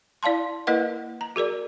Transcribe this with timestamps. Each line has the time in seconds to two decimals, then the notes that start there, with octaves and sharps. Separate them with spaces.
0.23 E4 D5 F5 A5 C6
0.67 A#3 E4 A#4 B4 D#5 F#5
1.21 A#5
1.36 F#4 G#4 A#4 D5